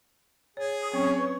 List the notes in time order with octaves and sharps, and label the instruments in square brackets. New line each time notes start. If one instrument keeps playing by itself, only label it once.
[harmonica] G#4 [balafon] C#5
[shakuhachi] D#6
[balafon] F#3 C4 C#4 [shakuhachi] C#5
[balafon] B4